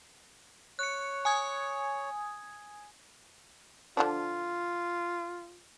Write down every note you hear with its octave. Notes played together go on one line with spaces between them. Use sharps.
C#5 F#6 C#7
G#5 D#6 G#6
D3 F3 D4 F4